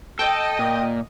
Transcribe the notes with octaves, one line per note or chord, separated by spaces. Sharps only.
A4 D#5 G5
A#2